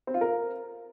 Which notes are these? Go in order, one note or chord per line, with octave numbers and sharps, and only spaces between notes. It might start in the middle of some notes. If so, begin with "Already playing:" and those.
C4
F4
A#4